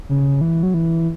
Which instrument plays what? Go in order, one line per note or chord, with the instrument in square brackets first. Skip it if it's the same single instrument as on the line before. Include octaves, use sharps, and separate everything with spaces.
[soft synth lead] C#3
E3
F#3
E3